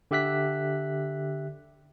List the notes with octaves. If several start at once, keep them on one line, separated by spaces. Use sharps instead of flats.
D3 G4 E5 F#6 B6